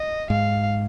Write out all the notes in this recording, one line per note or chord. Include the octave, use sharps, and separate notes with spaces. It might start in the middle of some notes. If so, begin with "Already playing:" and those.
Already playing: D#5
G#2 F5